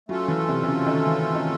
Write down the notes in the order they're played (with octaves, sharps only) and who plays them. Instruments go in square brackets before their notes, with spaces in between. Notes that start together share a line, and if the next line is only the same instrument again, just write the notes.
[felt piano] F#3 [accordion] A3 C#4 F4 A4
[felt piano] E3
C3
C3
C#3
D#3
E3
D#3